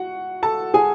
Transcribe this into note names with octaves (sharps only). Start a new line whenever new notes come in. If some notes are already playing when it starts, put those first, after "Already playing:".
Already playing: F#4 F#5
A4 A5
G#4 G#5